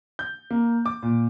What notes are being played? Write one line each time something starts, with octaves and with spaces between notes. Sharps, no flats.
G6
A#3
D6
A#2